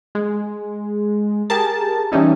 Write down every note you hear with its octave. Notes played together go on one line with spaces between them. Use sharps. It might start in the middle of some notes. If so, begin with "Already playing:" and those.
G#3
G4 G#4 A#4 A5
E3 G3 C#4 D#4 E4